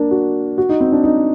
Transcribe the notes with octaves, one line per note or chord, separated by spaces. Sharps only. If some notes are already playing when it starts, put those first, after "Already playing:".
Already playing: A#3 D4
F#4
F#4
D#4
C4
D4
D#4